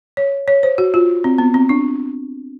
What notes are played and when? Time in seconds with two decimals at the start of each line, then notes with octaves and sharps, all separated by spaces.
0.17 C#5
0.48 C#5
0.63 C5
0.78 F#4
0.94 F4
1.24 C4
1.38 B3
1.54 C4
1.69 D4